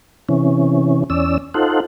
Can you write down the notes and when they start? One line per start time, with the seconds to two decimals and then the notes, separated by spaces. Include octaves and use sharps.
0.29 C3 E3 C#4
1.10 E2 C#4 D5 E6
1.54 D#4 F4 A4 C5 F#5